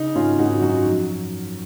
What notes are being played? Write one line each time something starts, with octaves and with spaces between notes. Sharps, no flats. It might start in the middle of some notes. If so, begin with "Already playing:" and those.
Already playing: C#3 D#4
G#1 C#4 F4
G#1 D#4 F#4
F#2 D#4 F#4
F3